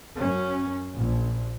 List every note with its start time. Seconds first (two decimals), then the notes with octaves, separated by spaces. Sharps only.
0.19 F#2 C#4
0.95 A#1